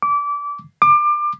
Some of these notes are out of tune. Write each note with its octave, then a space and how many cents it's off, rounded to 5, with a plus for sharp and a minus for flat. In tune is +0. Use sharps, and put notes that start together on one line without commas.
D6 -25
D6 +25